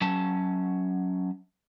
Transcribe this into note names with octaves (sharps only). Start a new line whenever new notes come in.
F#3 C#4 A5